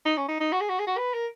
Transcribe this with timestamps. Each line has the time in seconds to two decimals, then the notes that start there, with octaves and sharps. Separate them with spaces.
0.06 D#4
0.17 C#4
0.29 D#4
0.40 D#4
0.52 F#4
0.61 G#4
0.69 F#4
0.79 G#4
0.87 F#4
0.98 B4
1.14 A#4